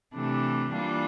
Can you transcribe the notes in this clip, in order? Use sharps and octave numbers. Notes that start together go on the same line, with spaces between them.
C3 E3 A3 D4 G4
E3 G3 A#3 D4 F4